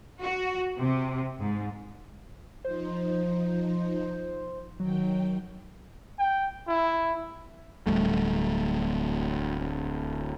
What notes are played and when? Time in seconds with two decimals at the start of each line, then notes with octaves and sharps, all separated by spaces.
0.19 F#4
0.77 C3
1.39 G#2
2.65 F3 D#4 C5
4.80 D#3 F#3 G5
6.18 G5
6.68 E4
7.87 D1 D#2 G3 A3